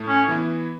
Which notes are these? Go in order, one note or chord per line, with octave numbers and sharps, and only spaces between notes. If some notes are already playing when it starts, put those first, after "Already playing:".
Already playing: A2 A3
C#4
E3 B3 E4